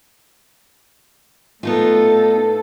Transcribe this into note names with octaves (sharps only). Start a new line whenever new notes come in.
A2 B3 D#4 F4 A4